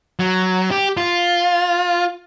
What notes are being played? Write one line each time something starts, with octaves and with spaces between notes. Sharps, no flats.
F#3
G4
F4